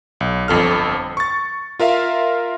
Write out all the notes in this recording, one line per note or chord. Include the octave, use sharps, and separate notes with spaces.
B1
G1 F2 A4 F6
C#6 A6
F4 A#4 E5 F5